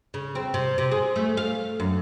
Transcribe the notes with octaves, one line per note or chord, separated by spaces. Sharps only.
C#3
C4
C3
C3
G#4
A3
F5
F#2